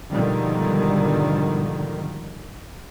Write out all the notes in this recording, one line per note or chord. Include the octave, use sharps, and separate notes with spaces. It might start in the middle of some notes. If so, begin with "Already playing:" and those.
G#2 B2 D3 D#3 F3 G3